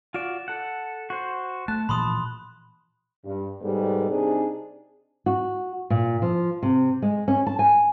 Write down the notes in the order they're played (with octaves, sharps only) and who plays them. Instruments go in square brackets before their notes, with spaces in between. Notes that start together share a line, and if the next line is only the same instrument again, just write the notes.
[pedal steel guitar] F4 F#4 D5 [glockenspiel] E7
[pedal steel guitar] A4 F#5
F#4 C5
[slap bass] A3 [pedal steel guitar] A5 [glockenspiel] F#6
[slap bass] A#2 E3 F3 [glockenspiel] B5 C6 D#6
[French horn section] G2
G#2 B2 G3 G#3 B3 A4
C3 D4 D#4 G#4
[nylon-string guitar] F#4
A#2
F3
C3
G#3
C#4
A5
G#5